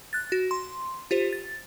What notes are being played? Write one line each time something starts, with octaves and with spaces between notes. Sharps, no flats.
F#6 A6
F#4
C6
F4 G4 C5
A6